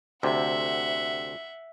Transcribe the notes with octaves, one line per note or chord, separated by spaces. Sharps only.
D2 C3 E5 F#5